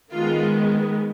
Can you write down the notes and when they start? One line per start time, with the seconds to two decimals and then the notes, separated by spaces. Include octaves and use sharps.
0.13 D#3 G#3 B3 F4